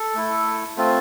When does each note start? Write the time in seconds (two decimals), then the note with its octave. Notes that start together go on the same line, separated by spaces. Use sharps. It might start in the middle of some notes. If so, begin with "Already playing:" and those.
Already playing: A4
0.15 A3 E4
0.77 A3 C4 F4